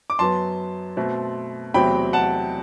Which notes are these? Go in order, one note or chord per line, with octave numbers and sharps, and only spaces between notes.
D6
F#2 F#3 B3 A5 C6
B2 A3 C4
E2 C3 F#3 A3 C4 G5 B5
F#5 A5